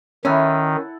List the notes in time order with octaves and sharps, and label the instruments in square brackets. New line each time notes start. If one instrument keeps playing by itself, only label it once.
[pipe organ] D#3 [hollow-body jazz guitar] C#4 [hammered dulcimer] E4 A4 F#5